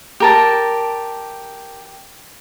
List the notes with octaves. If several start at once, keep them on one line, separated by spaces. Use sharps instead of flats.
G4 A#4 A5